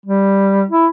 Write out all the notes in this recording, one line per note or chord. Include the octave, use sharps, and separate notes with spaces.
G3
E4